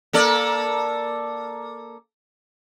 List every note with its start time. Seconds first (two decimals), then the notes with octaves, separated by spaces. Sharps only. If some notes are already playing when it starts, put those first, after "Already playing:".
0.13 A#3 A4 D5